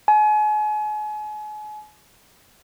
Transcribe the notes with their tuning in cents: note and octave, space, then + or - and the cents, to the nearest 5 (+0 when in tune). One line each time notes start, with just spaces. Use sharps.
G#5 +35